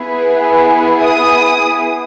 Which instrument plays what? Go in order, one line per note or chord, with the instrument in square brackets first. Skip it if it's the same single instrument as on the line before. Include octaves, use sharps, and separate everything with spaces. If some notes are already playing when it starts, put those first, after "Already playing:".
Already playing: [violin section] B3 E4 G#4
D#6